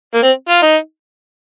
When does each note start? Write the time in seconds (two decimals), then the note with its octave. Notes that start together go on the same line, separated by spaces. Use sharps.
0.14 A#3
0.23 C4
0.49 F4
0.62 D#4